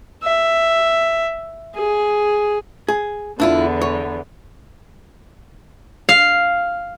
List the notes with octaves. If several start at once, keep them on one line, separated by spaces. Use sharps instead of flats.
E5
G#4
G#4
E2 D3 B3 D4 E4 F4
C#5
F5